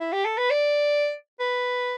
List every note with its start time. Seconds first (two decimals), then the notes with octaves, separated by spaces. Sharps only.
0.00 E4
0.13 G4
0.25 A4
0.38 B4
0.50 D5
1.40 B4